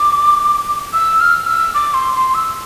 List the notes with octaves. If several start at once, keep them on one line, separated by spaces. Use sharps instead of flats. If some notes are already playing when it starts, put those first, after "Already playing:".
Already playing: D6
E6
F6
E6
D6
C6
C6
E6